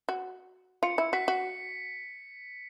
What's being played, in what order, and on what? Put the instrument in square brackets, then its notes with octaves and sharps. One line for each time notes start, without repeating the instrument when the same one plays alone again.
[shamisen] F#4
[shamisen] F4 [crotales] C#7
[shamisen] E4
[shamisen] F#4 [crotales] B6
[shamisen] F#4